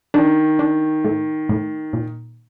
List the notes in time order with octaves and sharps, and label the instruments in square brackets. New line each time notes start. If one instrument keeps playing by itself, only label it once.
[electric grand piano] D#3 [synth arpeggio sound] D4
[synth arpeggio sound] D4
A2
A2
A#2